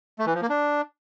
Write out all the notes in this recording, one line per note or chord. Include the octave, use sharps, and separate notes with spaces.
A3
E3
F3
A#3
D4